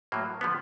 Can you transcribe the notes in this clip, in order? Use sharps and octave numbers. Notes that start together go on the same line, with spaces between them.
A2 F#3 A#3
D3 F3 B3